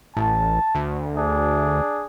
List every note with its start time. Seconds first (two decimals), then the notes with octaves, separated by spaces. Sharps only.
0.17 A1 A5
0.75 D2
1.18 D4 G#4